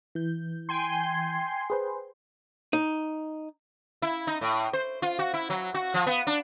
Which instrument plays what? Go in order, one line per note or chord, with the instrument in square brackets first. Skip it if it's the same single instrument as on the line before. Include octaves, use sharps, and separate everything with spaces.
[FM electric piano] E3 G6
[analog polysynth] G5 G#5 C6
[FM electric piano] G#4 B4 C5
[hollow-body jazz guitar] D#4
[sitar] E4
D#4
A2
C5
F4
F#4
E4
F#3
F#4
F3
B3
D4